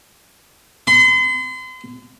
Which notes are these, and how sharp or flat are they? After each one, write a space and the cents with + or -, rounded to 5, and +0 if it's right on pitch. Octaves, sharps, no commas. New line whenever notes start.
C6 -40